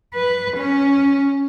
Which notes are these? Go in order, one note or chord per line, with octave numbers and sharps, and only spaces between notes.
B4
C#4